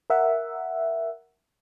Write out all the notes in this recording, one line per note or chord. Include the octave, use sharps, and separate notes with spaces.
A#4 E5 F#5